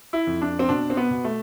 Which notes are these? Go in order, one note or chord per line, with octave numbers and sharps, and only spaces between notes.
E4
F2
D4
C4
B2 D4
C4
B3
B2
A3